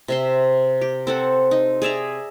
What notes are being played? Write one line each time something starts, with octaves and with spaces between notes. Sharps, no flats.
C3 E5 C6
G4
C4 A4 F#5
D#4
G#4 D5 E5 A#5